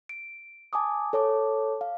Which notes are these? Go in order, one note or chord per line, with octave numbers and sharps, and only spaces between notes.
D7
G#5 A5 D6 D#6
A4 C#5 A5 D6
F5